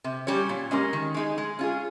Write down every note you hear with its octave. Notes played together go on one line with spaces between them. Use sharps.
C3
G3 C#4 G4 C#5
A#2
G#3 C#4 G4 A#4
D#3
G#3 D#4 G#4
G#3
C#4 F4 G#4